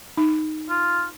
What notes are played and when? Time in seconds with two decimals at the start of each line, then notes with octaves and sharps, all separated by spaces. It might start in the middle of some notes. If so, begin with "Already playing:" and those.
0.17 D#4
0.70 F4